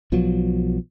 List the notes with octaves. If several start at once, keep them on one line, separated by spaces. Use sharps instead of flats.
B1 B2 F3 F#3